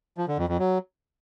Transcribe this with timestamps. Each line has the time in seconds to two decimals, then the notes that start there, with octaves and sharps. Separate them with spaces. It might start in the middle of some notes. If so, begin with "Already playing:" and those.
0.17 F3
0.28 D3
0.38 F2
0.49 F2
0.59 F#3